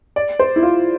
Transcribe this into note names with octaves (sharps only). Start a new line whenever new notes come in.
D5
C5
E4
F4